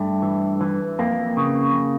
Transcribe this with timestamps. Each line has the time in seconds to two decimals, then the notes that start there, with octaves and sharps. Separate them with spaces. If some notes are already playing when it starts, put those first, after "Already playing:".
Already playing: G2 A3
0.22 E3
0.61 E3
0.99 F2 A#3
1.37 C#3